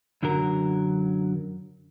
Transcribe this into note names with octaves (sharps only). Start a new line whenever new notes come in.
F#2 D3 F#3 A#4